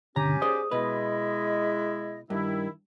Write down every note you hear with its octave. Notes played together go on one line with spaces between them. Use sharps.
G2 B2 D3 C#4 G4 G#5 A#5
G#4 C5 D5 D#6
B2 G#3 E4 B4 D#5
G2 D#3 E4